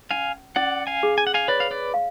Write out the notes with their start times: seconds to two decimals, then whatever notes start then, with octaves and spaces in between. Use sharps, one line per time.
0.11 C#4 F5 G#5
0.56 C#4 D5 F#5
0.87 F5 G#5
1.03 G#4
1.18 G#5
1.27 F#5
1.34 F5 G#5
1.48 B4 C#5 D5
1.60 F5
1.71 B4 D5
1.94 F5